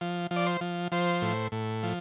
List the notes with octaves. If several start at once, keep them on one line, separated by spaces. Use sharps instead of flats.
F3
F3
D5
C5
F3
F3 C5
A2
A2
F3